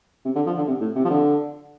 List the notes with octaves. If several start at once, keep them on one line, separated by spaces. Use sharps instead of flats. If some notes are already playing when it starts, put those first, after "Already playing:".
C3
D3
F3
D3
C3
A2
C3
F3
D3